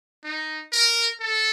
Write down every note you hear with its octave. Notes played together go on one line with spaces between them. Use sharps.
D#4
A#4
A4